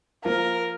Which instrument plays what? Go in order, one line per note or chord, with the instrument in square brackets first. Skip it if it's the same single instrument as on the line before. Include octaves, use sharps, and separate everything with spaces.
[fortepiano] F3 A#3 F4 [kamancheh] A#4